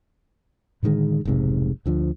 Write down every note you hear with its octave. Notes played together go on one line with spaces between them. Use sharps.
A2 D3 D#3 G#3
F1 B1 G#2 C3
D2 D3 F3